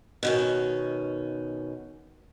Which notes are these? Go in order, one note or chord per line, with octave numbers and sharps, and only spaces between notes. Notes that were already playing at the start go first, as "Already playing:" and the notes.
B2 D#3 C#4